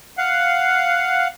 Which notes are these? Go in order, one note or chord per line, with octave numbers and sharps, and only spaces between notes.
F5 F#5